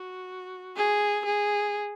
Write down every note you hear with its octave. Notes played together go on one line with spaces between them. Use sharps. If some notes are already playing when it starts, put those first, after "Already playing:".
Already playing: F#4
G#4
G#4